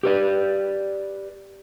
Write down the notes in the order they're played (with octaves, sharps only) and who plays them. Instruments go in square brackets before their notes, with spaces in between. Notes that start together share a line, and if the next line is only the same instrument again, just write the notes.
[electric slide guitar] G4 B4 D5